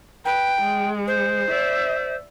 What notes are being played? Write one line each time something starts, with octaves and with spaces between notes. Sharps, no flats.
B4 G5
G#3
C5
D5 E5